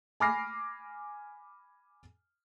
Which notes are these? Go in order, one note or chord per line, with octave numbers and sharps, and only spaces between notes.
G#5 B5 D6 F6 A#6 C7